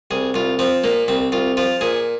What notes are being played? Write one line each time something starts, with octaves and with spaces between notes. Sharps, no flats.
C2 G#4
C2 F4
F3 C4
A#2 A#3
C2 C4
C2 F4
F3 F4
A#2 G#4